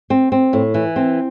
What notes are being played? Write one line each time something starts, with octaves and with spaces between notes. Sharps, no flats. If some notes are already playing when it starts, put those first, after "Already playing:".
C4
C4
A2
E3
C4